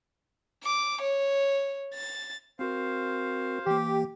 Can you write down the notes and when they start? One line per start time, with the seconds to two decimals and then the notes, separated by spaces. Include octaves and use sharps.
0.64 D6
1.01 C#5
1.94 A6
2.59 C4 F#4 A#4 C5 F5
3.67 E3 A#3 G4